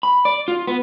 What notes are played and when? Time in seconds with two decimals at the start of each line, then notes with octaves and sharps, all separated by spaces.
0.03 B5
0.25 D5
0.48 F4
0.67 B3